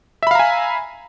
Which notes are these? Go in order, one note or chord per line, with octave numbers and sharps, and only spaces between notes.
E5 F5 G#5 A#5 B5